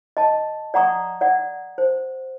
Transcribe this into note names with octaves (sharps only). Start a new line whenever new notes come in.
D#5 A5
D5 F#5 A#5 C#6 D#6
D5 F#5
C5